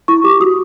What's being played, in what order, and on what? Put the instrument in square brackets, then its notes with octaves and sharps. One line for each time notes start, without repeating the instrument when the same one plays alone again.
[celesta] E4 C#6
G4 D6
F#4 D#6